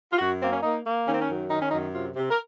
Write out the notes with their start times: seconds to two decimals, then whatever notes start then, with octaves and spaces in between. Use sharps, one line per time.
0.13 F4
0.19 F#2 F#4
0.41 A#3 C4
0.52 C#4
0.62 A#3 D#4
0.84 A#3
1.07 D#3 C#4
1.14 C4
1.21 C#4
1.29 F#2
1.50 D#3 D#4
1.61 C#4
1.71 F#2 D#4
1.94 C3 F4
2.16 C3
2.30 A#4